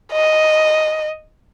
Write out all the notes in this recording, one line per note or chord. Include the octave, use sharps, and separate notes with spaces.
D#5